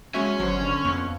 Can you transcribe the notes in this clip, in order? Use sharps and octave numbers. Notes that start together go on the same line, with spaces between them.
G#3 C#4 F#4 E5
G1 F#3 C5
D3
F2 B3